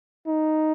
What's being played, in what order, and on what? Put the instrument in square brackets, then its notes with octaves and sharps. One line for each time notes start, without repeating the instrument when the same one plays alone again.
[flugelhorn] D#4